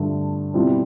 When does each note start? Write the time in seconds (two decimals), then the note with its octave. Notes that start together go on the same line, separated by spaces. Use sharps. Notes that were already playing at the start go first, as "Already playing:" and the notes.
Already playing: G2 D3 A3
0.54 B2 G3 C4 E4